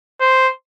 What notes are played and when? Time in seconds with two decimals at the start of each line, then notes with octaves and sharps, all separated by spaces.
0.20 C5